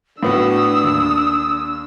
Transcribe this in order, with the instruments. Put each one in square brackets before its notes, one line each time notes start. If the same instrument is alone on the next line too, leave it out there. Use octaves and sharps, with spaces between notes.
[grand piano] A2 B3 F#4 [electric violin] D4 E6 [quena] D#6
[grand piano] D#2